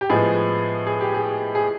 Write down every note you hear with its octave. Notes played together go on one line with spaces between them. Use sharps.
G4
A2 F3 G#3 B3 G#4
G#4
G4
G#4
G#4